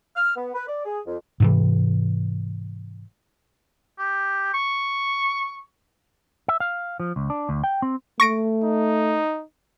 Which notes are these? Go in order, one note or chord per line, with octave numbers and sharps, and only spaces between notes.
F6
B3
B4
D5
G#4
F2
G#2 C3 E3
G4
C#6
E5
F5
F3
C#2
D4
D2
G5
C4
A3 C#6 A#6 D7
D#4